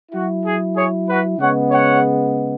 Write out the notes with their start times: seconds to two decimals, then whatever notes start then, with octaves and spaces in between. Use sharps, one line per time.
0.12 F#3 E4 F#4
0.44 G#4
0.75 G#4 C#5
1.07 F#4 B4
1.39 C#3 G#3 B3 C#5 F#5
1.71 C#5 F#5